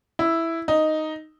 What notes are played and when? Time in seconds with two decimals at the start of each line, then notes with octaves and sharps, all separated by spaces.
0.19 E4
0.68 D#4